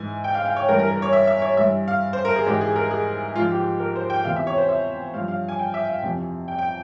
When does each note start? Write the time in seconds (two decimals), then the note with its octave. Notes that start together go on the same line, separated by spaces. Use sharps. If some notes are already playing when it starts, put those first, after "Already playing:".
Already playing: G#2 E3 G#5
0.24 G5
0.34 F5
0.45 F5
0.56 C#5
0.68 G2 E3 A#4
0.79 A#4
0.91 A#4
1.02 C#5
1.13 E5
1.27 E5
1.42 C#5
1.57 G2 E3 E5
1.88 F5
2.13 C5
2.25 A#4
2.36 G#4
2.46 G#2 E3 G4
2.61 G#4
2.76 A#4
2.91 G#4
3.36 G#2 F3 F4
3.51 G4
3.80 A#4
3.96 C5
4.10 G5
4.24 E2 C3 E3 F5
4.36 E5
4.47 C#5
4.58 C5
4.69 E5
5.14 G2 F3 F5
5.28 F5
5.48 G#5
5.59 G5
5.74 E5
5.89 F5
6.03 F2 C3 E3
6.48 G5
6.58 G5